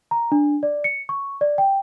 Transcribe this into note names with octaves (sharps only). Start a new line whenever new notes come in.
A#5
D4
D5
C#7
C#6
D5
G5